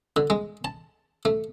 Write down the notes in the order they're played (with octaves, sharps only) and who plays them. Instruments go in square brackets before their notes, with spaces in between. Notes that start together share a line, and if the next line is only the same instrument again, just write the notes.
[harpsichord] D3
G#3
A5
A3